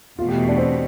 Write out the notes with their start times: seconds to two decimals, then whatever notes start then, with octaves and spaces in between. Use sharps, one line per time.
0.19 E2 B2 A3 F4
0.29 G4
0.48 D4
0.58 C4